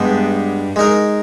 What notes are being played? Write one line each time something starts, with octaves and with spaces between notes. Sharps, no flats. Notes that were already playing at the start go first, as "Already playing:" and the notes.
Already playing: G2 G#3 B3 G4
G#3 D#4 A#4